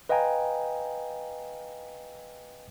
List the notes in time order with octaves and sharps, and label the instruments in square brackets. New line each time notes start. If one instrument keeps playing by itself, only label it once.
[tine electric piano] B4 D#5 F5 G5 G#5 A#5